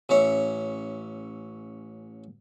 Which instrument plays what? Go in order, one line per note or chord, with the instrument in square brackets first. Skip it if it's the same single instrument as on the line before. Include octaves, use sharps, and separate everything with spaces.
[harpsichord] A1 C#4 C#5 E5